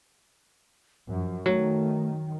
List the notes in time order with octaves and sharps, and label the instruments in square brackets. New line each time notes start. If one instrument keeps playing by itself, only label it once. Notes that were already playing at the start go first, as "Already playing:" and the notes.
[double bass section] F#2 [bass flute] F3
[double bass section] D#3 [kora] F#3 [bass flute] A3